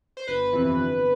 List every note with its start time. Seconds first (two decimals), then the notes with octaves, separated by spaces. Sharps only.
0.17 C5
0.27 G1 B4
0.53 F2 C3 E3
0.79 G1